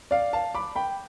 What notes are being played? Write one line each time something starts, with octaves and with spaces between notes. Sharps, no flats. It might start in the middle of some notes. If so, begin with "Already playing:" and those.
D5 F5
F5 A5
B5 D6
G5 B5